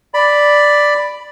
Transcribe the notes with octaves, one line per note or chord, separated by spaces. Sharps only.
D5 B5